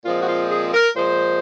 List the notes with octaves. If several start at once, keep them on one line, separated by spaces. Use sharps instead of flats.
A#2 F3 G#3 C4 F4
F#4
F4
G#4
A#4
A#2 F3 G#3 C5